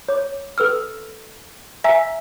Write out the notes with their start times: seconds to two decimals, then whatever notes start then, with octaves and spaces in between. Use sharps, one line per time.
0.09 C#5 D6
0.58 A4 B4 E6 F6
1.84 E5 G#5 A#5 E6 B6